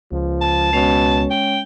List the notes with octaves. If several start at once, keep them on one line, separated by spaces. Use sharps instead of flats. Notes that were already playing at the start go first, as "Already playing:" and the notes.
C#2 F3
A5
B2 G#3 C#4 C#5
G5